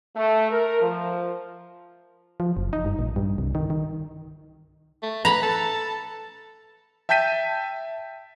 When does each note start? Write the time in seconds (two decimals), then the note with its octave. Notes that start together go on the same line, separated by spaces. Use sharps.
0.16 A3
0.50 A#4
0.81 F3
2.40 F3
2.57 F#1
2.73 D#4
2.85 G2
2.99 A#1
3.16 G2
3.38 C2
3.55 D#3
3.70 D#3
5.03 A3
5.25 B4 A#5 B5
5.42 A4
7.09 E5 G5 A5 G6 B6 D#7